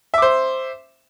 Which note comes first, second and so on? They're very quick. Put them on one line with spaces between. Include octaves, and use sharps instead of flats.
E5 D6 C5